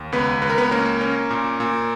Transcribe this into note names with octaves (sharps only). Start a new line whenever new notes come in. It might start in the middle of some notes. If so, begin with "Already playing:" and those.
Already playing: D#2
C#2 B3 B4
C#2 B4
A#4
B3 B4
A#3 C#4 A#4
C#4
A#2
A#2